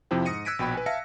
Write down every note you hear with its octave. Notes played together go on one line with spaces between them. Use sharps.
F2 C3 F3 E4 C5 G5
G#2 D#6 A#6 C#7 D#7
E6 F#6 G#6 B6 D7 D#7
A#1 B2 G5 B5
B4 G#5
E5 F5 A5 A#6 C#7